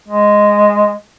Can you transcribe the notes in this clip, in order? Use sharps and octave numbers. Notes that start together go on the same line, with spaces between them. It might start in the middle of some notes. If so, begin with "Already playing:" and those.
G#3